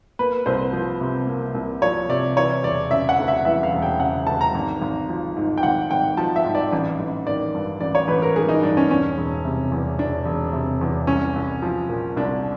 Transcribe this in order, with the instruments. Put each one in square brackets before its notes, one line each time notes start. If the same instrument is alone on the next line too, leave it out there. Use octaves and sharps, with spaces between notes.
[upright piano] A#3 B4
C2 C5
F3
C3
A#3
C2
F3 C#5
C3 D5
E3 C#5
E1 D5
C#3 E5
F#5
D2
E5
E3 E5
F5
E1
G5
C#3 F#5
D2 A5
A#5
G#1
G#1
F3
G#2
G5
G#1 F#5
G#1 G5
F3 A5
E5
G#2
D5
A1
A1
D#3 D5
G2
A1 D5
C#5
A1 B4
A#4
D#3 G#4
D#4
G2 D4
C#4
E1 C#4
E1
C3
E2
E1 D4
E1
C3
E2
C2 C#4
C2
F3
A#2
C2 D4